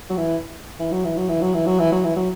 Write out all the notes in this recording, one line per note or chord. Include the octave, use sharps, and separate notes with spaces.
F#3
E3
E3
F#3
E3
F#3
E3
F#3
E3
F#3
E3
F#3
E3
F#3